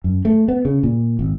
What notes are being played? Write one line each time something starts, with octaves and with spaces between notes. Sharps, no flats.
F#2
A3
B3
C#3
A#2
G#1